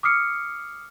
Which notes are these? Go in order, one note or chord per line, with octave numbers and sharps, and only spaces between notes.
D6 D#6 F6 C7 C#7